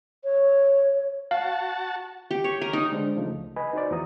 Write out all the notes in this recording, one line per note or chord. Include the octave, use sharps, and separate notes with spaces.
C#5
F#4 F5 A5
G4
C#5
A#4
D#4
D3 G#3 D4 C5
C#3 F3 A3 D#4
C#2
B4 D#5 G#5 B5
D#4 F#4 B4 C5 D5
E2 F3 E4 F#4 A#5 D#6